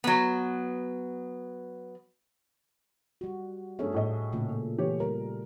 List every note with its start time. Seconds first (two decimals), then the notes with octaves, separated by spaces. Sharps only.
0.04 F#3 B3
3.21 G3 F#4
3.79 G2 A3 C#4 D4 G#4 E5
3.94 A2 D#5
4.32 A#2 C#3 A3
4.78 E3 G4 C#5
5.00 G3 A#4